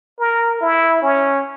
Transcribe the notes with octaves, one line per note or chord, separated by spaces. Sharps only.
A#4
E4
C#4